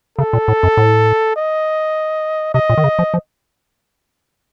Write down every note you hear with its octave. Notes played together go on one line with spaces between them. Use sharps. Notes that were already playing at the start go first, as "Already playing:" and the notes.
C#3 A4
A#2
A2
F#2
A2
D#5
C3 D#5
A#2
D#3
C#3
F3
F3